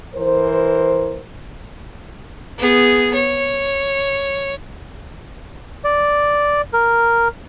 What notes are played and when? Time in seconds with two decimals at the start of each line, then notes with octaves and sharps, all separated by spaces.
0.16 E3 A#4 C5
2.58 B3 G#4
3.14 C#5
5.84 D5
6.73 A#4